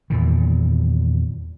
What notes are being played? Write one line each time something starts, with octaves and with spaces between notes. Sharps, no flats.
E2 A#2 D#3